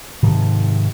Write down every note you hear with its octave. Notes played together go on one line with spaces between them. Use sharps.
G#2 C3 D#3 F3